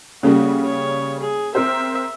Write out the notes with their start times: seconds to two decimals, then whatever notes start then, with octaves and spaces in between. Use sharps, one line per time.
0.23 C#3 G3 A#3 C#4 F#4 A4
0.66 C#5
1.20 G#4
1.55 C4 A#4 C5 E5